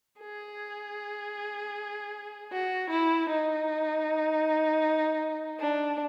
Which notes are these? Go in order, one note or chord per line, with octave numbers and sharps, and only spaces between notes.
G#4
F#4
E4
D#4
D4